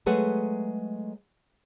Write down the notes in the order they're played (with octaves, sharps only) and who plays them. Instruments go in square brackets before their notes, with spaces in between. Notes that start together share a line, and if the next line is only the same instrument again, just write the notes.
[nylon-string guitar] F#3 G#3 A3 G#4 B4 F#5